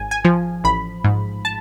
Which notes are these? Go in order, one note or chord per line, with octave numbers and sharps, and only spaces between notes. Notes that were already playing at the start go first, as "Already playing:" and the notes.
Already playing: G#1 G#5
G#5
F3
A1 B5
G#2
A5